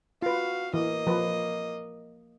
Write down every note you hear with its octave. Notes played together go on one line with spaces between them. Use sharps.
F4 F#4 B4 F5
E3 A#3 D#5
F3 B4